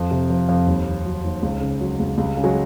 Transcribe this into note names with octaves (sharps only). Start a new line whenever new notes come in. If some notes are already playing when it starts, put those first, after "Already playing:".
Already playing: F2
C3
F3
F2
D#2 G3
D#3
F#3
D#2
C#2
C#3
F#3
C#2
C#2 G3
C#3
F#3 G#3